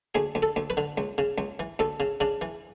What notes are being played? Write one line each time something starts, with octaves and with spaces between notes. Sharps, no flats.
D2 G#4
D2
A4
D2
B4
D3
C#2
C#3
C#2
E3
D2 A4
C#3
C#3 D4
E3